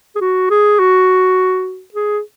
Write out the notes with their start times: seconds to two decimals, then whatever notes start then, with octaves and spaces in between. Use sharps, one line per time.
0.16 G#4
0.21 F#4
0.50 G#4
0.79 F#4
1.94 G#4